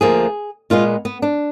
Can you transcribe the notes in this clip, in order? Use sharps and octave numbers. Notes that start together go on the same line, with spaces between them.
D2 D3 F3 A#3 G#4
A#2 G#3 B3 F4
B3
D4